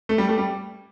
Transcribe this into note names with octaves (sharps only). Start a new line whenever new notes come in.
A3
G3
A3
G3